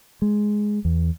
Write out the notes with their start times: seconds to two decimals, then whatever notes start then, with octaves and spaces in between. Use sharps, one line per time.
0.22 G#3
0.85 E2